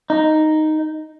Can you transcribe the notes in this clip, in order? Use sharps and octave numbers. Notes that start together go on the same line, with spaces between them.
D#4